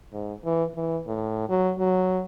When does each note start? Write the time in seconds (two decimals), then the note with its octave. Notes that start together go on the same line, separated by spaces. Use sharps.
0.13 G#2
0.45 E3
0.75 E3
1.07 A2
1.49 F#3
1.78 F#3